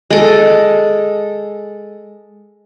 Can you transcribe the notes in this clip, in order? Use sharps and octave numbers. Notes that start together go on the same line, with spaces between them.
G#3 A4